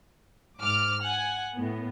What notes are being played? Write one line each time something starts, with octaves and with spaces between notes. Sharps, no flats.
G#2 D6 F6
F#5 G#5
A2 B3